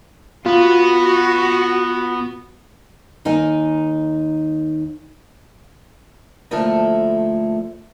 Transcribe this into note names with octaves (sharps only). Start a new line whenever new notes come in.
B3 F4 F#4
D#2 D#4 A#4 D#5 G#5
D2 F3 A3 A#3 E4 A4